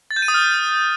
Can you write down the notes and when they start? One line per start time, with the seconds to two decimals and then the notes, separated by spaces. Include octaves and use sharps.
0.11 A6
0.16 G6
0.22 D#7
0.28 D#6
0.34 F6